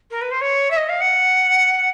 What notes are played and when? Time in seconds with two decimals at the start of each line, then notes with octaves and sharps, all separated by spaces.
0.11 A#4
0.21 B4
0.31 C5
0.41 C#5
0.71 E5
0.77 D#5
0.89 F5
1.01 F#5